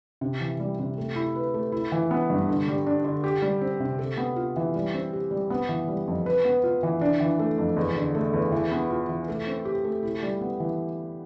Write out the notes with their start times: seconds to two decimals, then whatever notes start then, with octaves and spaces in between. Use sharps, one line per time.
0.21 C3
0.40 E3
0.60 G3
0.79 C3
0.98 A3
1.16 E4
1.36 B4
1.54 A3
1.72 E4
1.92 E3
2.11 B3
2.30 G2
2.49 D3
2.68 G3
2.86 D4
3.04 D3
3.24 G4
3.42 G3
3.61 C4
3.80 C3
3.99 A4
4.18 B3
4.36 F4
4.56 E3
4.75 G3
4.94 C4
5.13 G4
5.31 G3
5.50 B3
5.69 E3
5.88 G3
6.07 F2
6.26 B4
6.45 B3
6.64 F4
6.83 E3
7.01 D4
7.20 E3
7.39 A3
7.58 F2
7.76 E2
7.96 D3
8.15 A3
8.33 E2
8.52 E3
8.72 B3
8.90 F4
9.09 E3
9.28 A3
9.47 C4
9.65 G4
9.85 A3
10.03 E4
10.22 G3
10.41 B3
10.60 E3